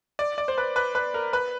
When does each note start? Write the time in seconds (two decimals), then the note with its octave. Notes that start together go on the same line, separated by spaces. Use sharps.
0.19 D5
0.38 D5
0.48 C5
0.58 B4
0.76 B4
0.95 B4
1.14 A#4
1.33 B4